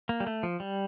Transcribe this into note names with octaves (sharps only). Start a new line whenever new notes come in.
A#3
G3
A3
F3
G3